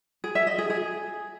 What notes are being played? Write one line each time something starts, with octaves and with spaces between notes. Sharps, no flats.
G#4
E5
D#5
G#4
G#4